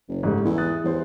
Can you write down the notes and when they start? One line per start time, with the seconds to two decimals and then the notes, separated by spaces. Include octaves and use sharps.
0.09 F#1
0.23 G#2 G3 A3
0.45 E2 E4
0.58 D#6 F#6 A6
0.84 E2 G3 C5